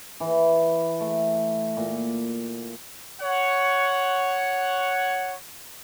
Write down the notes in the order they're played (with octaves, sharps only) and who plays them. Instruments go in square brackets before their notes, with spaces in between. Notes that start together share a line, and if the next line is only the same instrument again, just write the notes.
[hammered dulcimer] E3
A3
A#2
[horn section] C#5 F#5